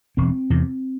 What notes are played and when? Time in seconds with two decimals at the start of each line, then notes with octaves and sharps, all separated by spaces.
0.17 E1 C4
0.50 E2 C3